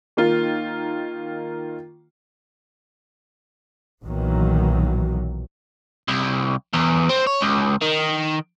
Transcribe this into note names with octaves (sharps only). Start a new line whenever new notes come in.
D#3 A#3 F4
B1 A#2 D#3 E3 F#3
C2
E2
C4
C#5
C#2
D#3